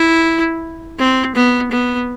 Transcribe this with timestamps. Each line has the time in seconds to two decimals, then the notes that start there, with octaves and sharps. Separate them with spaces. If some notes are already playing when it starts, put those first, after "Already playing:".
Already playing: E4
0.99 C4
1.35 B3
1.72 B3